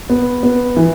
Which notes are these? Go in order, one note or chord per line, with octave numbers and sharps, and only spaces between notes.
B3
B3
E3